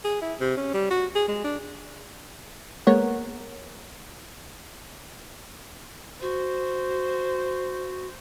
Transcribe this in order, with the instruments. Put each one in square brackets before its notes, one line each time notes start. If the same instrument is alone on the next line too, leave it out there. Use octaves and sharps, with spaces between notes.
[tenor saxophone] G#4
E4
C3
C#4
G3
F#4
G#4
G#3
D4
[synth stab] G#3 A#3 B3 A#4 C#5 F#5
[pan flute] F#4 [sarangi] C5